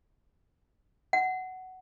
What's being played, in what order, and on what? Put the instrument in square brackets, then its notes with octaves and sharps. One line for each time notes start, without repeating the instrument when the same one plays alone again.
[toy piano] F#5